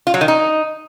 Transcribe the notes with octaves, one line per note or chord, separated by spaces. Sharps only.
F4
F#3
D#3
D#4